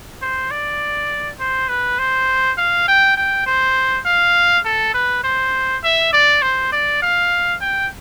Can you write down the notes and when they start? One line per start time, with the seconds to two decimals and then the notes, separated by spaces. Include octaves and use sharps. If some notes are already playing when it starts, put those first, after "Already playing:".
0.22 C5
0.51 D5
1.39 C5
1.69 B4
1.99 C5
2.58 F5
2.88 G5
3.17 G5
3.46 C5
4.06 F5
4.65 A4
4.94 B4
5.24 C5
5.84 E5
6.13 D5
6.42 C5
6.72 D5
7.02 F5
7.61 G5